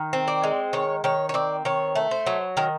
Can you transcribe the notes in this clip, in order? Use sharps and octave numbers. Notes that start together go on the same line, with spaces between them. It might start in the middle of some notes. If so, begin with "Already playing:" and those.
Already playing: D#3
C4
D5
G#3
D#3 C#5
D#3 C#5
C#5
C4 D5
D#3 C#5
A3
C5
F#3
D#3 A#4